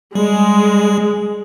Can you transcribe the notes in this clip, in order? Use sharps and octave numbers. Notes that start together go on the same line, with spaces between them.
G3 G#3